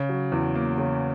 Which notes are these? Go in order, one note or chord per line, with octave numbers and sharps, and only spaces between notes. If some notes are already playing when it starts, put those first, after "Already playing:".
Already playing: C#3
F#3
E2
A#3
C#3